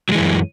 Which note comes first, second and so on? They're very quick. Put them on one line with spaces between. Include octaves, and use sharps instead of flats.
F#3 G#3 E3 F#2